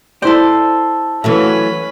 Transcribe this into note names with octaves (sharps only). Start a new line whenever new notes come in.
E4 A4 C5 D5
E3 F#3 A3 C#4 B4